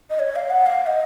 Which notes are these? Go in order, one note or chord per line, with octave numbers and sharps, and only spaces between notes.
D#5
C#5
F5
F#5
F5
F5
D#5